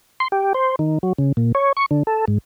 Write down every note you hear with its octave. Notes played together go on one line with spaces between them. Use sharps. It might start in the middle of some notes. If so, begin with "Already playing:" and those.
C6
G4
C5
D#3
F#3
C#3
A#2
C#5
C#6
D3
A4
G#2